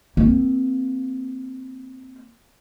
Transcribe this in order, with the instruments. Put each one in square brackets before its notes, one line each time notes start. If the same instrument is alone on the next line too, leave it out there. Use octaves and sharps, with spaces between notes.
[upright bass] A#3 C4